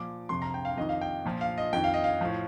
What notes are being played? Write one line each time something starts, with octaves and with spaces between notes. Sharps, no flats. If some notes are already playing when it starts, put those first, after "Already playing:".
Already playing: A#2 F3 D6
F2 C3 F3 C6
A#5
G5
F5
F2 D#3 D#5
F5
G5
A#2 F3
F5
D#5
F2 D#3 G5
F5
D#5
F5
A2 F3